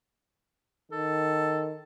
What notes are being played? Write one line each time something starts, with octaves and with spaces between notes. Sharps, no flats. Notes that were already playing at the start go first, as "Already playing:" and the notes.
D#3 A4